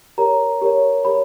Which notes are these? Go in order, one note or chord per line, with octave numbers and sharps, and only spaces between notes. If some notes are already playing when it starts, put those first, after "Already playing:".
G4 A#4 C#5 A#5
G4 A#4 C#5
G4 A#4 C#5 B5